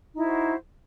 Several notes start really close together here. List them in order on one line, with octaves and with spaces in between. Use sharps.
D#4 E4 C5 F#4